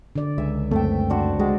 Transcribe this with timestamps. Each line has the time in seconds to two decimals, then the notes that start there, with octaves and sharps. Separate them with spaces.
0.16 D3 D5
0.38 C#2 E5 G#5
0.71 F#2 A3 C4 A4 G5
1.10 D4 F#4 C5
1.39 G#3 F#4 G4 D5